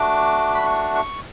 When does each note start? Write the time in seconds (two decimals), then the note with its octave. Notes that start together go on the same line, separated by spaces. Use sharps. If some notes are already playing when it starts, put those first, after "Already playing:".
Already playing: A3 D4 F#4 D6
0.55 B5
0.66 C#6
0.95 C#6